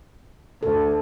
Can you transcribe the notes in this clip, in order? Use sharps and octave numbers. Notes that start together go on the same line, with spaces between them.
D2 A4